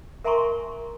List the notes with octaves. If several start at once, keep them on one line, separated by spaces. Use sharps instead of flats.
A#4 E5 G#5 A#5 C6 C#6